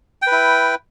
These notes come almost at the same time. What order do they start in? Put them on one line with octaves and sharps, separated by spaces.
G5 B4 E4